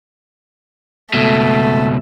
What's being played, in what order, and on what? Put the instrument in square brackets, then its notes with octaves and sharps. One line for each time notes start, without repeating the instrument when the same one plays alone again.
[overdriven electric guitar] C#2 B2 [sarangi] A3